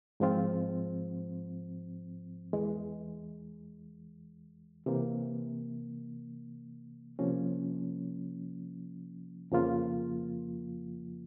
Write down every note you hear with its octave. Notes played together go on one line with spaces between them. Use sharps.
G#2 F3 G#3 C4 F4
E2 E3 G#3
C3 E3 A#3
C3 F3 A#3 C#4
F2 C#3 F3 A#3 F4